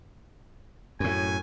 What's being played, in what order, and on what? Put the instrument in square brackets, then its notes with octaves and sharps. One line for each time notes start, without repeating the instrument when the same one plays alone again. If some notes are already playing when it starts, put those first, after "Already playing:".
[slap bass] F#2 A2 [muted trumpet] G#5